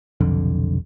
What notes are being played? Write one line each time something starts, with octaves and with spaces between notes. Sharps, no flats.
F1 B1 F2 D3